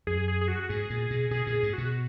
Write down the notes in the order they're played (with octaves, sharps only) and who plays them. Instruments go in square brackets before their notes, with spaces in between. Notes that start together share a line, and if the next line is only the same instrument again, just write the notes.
[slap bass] F#2 [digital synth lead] G#4
[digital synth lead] G#4
G#4
F#4
[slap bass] G#2 [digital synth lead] G#4
[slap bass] A#2
B2
[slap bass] B2 [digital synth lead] G#4
[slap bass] A#2
[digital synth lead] G#4
[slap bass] G#2
[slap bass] B2 [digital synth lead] F#4